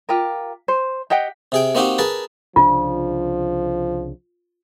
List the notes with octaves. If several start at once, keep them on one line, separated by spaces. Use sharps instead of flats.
F4 G4 A#4
C5
G4 D#5 F#5 G5
C3 G#4 G5
A#3 C4 D#4 F#4 G4
G#4 A#4 B4 A5
C2 C#3 F3 D4 F4